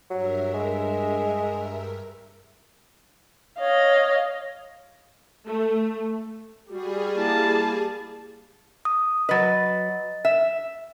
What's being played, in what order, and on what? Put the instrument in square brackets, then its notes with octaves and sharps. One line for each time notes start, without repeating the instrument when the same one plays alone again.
[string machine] G2 A#4 E5 [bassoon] F#3
[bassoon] G#3
[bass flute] C#5 [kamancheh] D#5 F5
[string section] A3
[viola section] G3 [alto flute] F#4 [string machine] G#4
[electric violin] A#3 A5 [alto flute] E4
[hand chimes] D#6
[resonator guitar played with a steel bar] F#3 B4 [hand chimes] D#5 A6
[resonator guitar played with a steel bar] E5